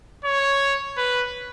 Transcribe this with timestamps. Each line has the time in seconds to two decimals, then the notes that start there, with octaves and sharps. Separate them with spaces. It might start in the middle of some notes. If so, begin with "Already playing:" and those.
0.25 C#5
0.98 B4